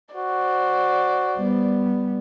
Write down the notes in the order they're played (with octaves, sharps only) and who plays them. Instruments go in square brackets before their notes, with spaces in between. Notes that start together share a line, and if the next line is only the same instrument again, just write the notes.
[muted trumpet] F#4 [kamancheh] C5 D5
[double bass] G3 B3